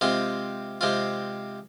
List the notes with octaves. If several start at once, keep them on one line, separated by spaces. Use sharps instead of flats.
C3 G#3 C4 F4
C3 G#3 C4 F4